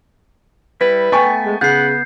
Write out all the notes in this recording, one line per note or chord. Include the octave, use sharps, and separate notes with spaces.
G3 E4 B4
A3 B3 G5 G#5 C#6
G#3
C#3 B3 F#5 G6 C7